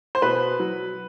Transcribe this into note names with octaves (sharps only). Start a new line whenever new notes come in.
C5
B2 B4
F#3